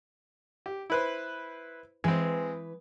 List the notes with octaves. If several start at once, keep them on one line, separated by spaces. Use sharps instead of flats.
G4
E4 B4 C5
E3 G#3 C4 B4